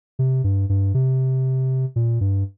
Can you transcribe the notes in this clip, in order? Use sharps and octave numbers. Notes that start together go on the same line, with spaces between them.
C3
G2
G2
C3
A#2
G2